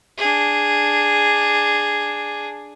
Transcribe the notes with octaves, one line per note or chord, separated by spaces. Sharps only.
D4 G#4